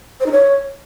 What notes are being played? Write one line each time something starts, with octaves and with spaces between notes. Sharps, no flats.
C5
D#4
C#5